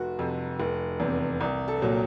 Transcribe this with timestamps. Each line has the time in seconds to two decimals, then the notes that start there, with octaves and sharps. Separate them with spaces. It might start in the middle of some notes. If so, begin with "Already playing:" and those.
Already playing: F1 F#4
0.19 F2 C3
0.60 F1
1.00 E2 C3
1.41 C2
1.68 A4
1.82 A#2 F#3